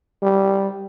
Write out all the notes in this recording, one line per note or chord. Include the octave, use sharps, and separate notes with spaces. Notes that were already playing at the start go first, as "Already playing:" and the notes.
G3